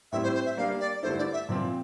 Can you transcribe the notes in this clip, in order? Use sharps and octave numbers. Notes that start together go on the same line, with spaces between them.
A2 G3 C4 E4 E5
C5
C5
E5
G3 A#3 D4 F5
D5
G2 D3 A3 E4 C5
D5
E5
A#2 F3 C4